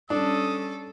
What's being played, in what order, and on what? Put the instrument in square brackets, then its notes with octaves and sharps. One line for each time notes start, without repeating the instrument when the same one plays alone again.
[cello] G3 C#4 [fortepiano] D4 [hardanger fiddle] A4 [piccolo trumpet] D#6